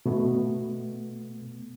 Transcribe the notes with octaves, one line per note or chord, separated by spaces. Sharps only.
B2 A3 B3